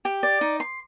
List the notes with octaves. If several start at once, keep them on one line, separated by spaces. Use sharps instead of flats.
G4
D5
D#4
C6